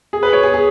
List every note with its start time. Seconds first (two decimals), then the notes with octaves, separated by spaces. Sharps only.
0.13 G#4
0.23 B4
0.33 C#5
0.43 G#4
0.54 G#4